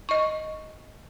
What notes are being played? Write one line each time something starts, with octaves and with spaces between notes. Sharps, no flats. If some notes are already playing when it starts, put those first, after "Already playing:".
D#5 C#6